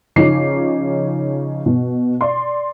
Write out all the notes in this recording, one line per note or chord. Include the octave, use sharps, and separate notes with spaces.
C#3 F3 C#4 D#4 D6 C7
B2
D5 C6